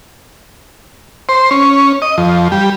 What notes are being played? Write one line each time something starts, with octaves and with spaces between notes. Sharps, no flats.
C5
C#4
D#5
F2
G3